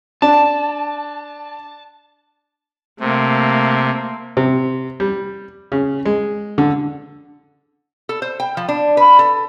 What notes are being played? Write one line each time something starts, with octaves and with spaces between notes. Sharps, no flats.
D4 A5
C3 A3 A#3
C3
G3
C#3
G#3
D3
A4
C5
G5
F3
D4
B4
A4